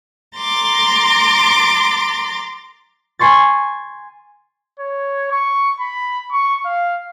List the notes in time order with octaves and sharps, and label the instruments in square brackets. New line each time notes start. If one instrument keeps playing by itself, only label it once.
[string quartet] A#5 C6 D6 A6
[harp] G#5 C6 C#6 A6
[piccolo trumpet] C#5
C#6
B5
C#6
F5